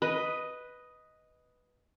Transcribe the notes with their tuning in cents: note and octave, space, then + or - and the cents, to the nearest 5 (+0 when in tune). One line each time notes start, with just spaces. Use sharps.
B4 +0 D#5 +5